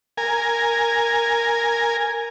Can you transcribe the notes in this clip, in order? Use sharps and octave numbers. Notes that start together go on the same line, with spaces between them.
A#4 G#5